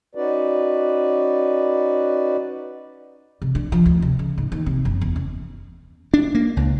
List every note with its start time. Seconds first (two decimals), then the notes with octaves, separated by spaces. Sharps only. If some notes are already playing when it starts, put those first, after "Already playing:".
0.15 C#4 D#4 F#4 B4 D5
3.42 C3
3.55 D4
3.72 F3
3.86 D2
4.02 C3
4.19 C#3
4.38 G#2
4.52 D#2
4.66 C3
4.85 F#1
5.01 E2
5.16 C#3
6.14 D4
6.35 A#3
6.57 C#2